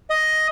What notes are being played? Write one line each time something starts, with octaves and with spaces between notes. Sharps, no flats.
D#5